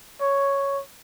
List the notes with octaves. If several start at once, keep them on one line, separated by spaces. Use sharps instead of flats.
C#5